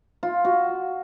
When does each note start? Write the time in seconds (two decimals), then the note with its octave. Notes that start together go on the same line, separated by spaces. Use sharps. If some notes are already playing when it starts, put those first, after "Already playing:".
0.23 F4
0.45 F#4